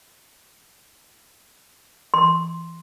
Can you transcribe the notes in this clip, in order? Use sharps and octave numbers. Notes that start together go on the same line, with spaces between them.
C6